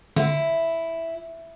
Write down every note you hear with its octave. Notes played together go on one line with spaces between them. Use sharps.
D3 E4